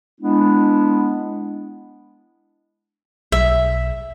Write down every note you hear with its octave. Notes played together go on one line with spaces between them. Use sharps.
G#3 B3 D4 E4
B1 E5